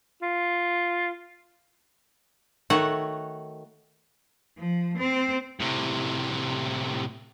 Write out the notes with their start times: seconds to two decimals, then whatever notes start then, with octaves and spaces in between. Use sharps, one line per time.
0.22 F4
2.70 D#3 A3 F#4 C#5 F#5
4.58 F3
4.98 C4
5.61 A2 C3